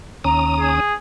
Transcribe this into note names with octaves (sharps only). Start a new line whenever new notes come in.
D#2 C#4 A#5 D#6
G#4